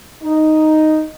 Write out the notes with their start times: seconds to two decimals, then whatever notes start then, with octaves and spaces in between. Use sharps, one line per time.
0.23 D#4